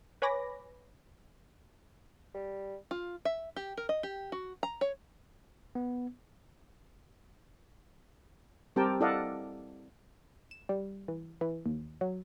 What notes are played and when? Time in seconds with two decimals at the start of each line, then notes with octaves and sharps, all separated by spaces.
0.22 B4 C#5 G#5 B5 D6 A#6
2.34 G3
2.91 F4
3.25 E5
3.56 G4
3.77 A#4
3.89 D#5
4.03 G4
4.32 F#4
4.63 A#5
4.81 C#5
5.75 B3
8.76 G3 C4 G4 A#4 G5 A5
9.00 E4 A4 D5 D#5 F5 F#5
10.51 E7
10.69 G3
11.08 E3
11.41 E3
11.66 D#2
12.01 F#3